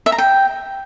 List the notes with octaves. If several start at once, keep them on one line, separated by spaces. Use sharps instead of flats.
E5
A#5
G5